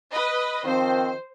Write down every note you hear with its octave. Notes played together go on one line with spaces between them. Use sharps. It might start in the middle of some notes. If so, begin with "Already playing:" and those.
B4 D#5
D#3 F3 C4 C5